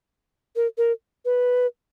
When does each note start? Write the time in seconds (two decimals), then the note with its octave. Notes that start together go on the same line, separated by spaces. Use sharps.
0.56 A#4
0.78 A#4
1.25 B4